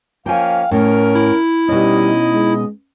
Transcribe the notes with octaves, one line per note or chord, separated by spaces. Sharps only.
F3 A#3 C#4 F5 G5 G#5
A2 C#4 A#4
E4
B2 G3 C#4 D#4 D#5
G#3